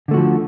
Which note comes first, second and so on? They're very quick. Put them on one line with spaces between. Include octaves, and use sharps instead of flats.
D3 A3 F#4 F3